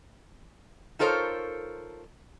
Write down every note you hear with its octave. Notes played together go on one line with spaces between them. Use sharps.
D#4 F4 A4 A#4 C5 C#5